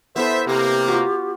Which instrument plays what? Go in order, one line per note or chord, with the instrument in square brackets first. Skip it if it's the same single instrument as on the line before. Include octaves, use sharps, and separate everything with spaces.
[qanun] B3 E4 A4 [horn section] C5 E5
[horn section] C3 A#3 [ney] G4
[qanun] F4 F#4